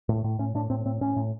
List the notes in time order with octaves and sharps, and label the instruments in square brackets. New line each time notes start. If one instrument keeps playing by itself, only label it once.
[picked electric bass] A2
A2
A2 C#4
A2 D4
A2 C4
A2 C4
A2 C#4
A2